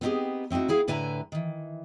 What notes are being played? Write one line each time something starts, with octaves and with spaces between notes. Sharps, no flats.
B3 C4 D#4 F4 G4 G#4
A3 C4 D#4 E4 F#4
B3 E4 G#4 F5
A2 D3 E4 B4 G#5 A#5
D#3 E3